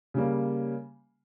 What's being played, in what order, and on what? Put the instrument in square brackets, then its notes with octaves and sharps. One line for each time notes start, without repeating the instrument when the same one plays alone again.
[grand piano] C#3 G3 A#3